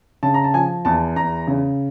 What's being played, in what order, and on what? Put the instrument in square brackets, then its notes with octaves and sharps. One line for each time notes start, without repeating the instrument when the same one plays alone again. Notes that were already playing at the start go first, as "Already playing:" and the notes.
[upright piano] C#3 A5
A#5
A5
F3 G#5
E2 A5
E2 A#5
C#3